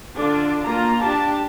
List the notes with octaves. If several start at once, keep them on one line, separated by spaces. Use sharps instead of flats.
D3 D4 F4 D5
A#3 F4 A#5
D4 G4 A5